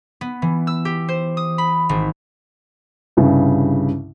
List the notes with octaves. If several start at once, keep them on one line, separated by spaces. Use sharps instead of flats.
B3
E3
E6
G4
C5
D#6
B5
G#1
C2 G2 C#3